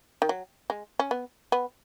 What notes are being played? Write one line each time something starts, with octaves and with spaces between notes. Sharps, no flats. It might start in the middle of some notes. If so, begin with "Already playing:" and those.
D#3
F#3
G#3
C#4
B3
B3